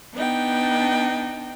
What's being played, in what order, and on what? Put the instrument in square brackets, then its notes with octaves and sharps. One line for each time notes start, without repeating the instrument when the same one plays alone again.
[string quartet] B3 D4 D#4 G5